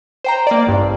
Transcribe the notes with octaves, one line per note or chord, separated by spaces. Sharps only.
C5 G5 A#5
A#3 D5
A1 G2